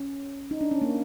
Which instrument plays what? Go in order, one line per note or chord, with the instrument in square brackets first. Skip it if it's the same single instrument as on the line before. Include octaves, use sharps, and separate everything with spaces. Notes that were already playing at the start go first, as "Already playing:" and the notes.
Already playing: [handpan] C#4
D#4
D4
C#4
A#3